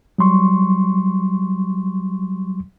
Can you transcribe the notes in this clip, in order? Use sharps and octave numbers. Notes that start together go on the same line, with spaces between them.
F#3 G3 C6 C#6